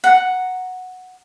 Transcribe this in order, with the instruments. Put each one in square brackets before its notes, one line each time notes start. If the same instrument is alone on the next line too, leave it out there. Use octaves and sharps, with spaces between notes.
[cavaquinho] F#5 A#5